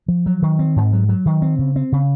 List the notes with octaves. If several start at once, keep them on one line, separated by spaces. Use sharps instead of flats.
F3
F#3
D#3
C4
G#2
F#3
F#3
D#3
C4
C#3
C4
C#3